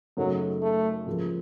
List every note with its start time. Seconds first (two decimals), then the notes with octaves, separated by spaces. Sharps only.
0.17 F#2 C#3 F#3 A3 D#4
0.62 A3
1.06 C#2 C#3 F3 A#3 F4